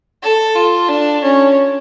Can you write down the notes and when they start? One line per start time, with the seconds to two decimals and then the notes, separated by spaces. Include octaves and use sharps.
0.23 A4
0.56 F4
0.89 D4
1.23 C#4